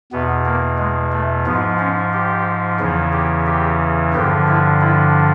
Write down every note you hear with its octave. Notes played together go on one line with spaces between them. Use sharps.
E2 B2 B3
A#3
G#3
A3
G#2 F3 B3
C#4
G4
E2 C#3 E3
G4
G4
G2 D3 F3 G4
E4
E4